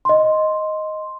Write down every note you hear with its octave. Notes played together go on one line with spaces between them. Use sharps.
D#5 C6